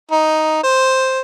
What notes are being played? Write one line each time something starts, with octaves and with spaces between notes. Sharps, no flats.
D#4
C5